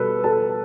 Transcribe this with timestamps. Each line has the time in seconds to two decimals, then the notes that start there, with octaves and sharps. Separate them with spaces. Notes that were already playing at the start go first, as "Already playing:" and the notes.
Already playing: B2 G3 A4 B4 B5
0.24 A4 A5